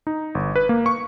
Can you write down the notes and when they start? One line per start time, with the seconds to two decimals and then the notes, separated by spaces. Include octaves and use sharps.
0.07 D#4
0.35 G1
0.56 B4
0.69 A#3
0.86 C#6